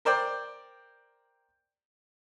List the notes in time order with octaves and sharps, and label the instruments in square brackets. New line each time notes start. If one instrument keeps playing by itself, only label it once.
[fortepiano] A#4 C5 D5 G5